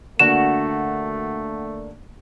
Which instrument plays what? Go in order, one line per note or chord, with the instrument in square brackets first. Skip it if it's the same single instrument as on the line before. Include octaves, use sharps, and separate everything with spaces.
[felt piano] D3 A#3 D4 [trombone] A3 [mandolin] F#4 [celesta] E7